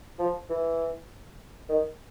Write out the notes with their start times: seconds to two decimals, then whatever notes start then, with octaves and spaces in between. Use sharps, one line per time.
0.19 F3
0.49 E3
1.69 D#3